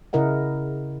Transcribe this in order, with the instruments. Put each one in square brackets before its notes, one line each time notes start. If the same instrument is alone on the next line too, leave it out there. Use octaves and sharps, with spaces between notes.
[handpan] C#3 E4 A#4 D#5 F#5